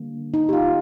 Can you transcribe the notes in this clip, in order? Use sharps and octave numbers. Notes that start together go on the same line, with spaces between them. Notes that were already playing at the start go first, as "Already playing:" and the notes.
Already playing: D3 G3 A#3
D#4
G4
F4